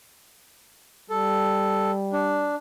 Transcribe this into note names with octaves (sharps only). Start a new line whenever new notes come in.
G3 A4
D4